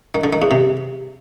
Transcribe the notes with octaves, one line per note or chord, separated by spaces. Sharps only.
D#3
D3
D#3
E2
C3